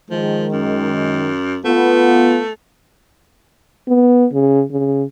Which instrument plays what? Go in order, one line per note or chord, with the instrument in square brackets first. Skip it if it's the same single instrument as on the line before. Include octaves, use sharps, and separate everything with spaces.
[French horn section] D#3 G#3 [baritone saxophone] F3
[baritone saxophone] F#2
[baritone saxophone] A3 [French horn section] B3 F4
[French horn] B3
C#3
C#3